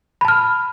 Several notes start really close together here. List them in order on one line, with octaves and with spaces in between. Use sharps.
B5 A5 F6